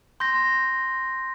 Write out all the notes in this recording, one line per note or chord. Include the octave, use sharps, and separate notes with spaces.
C6 G6 A#6